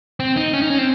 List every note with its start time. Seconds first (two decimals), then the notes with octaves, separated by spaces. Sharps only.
0.20 C4
0.37 D#4
0.53 C#4
0.62 D#4
0.70 C#4
0.78 C4